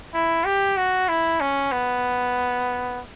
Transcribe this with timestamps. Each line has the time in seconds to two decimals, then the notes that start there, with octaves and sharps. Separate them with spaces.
0.14 E4
0.46 G4
0.77 F#4
1.09 E4
1.40 C#4
1.72 B3